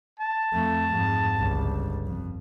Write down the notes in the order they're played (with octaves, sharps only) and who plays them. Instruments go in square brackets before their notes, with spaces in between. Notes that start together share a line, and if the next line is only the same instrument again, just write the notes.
[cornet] A5
[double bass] F2 A3
F2 G#2
G1 C#2
F2